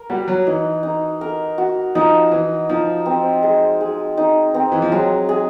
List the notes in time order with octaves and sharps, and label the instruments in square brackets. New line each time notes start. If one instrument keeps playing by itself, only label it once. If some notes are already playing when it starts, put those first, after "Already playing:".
Already playing: [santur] A#4
[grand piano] G3 [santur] F#4
[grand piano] F#3
[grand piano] E3 [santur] D#4
[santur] D#4
A#4
F#4
[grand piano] F3 [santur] D#4
[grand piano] E3 [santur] D#4
[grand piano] F3 [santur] D#4
[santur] C4
G#3
G#4
D#4
C4
[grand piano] E3
F3
[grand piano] F#3 [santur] G#3
[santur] G#4